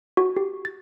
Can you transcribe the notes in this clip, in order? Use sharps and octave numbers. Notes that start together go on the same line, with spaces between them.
F#4
G4
A6